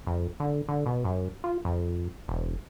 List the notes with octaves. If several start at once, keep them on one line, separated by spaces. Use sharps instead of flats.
F2
D3
D3
B2
F#2
F4
F2
E1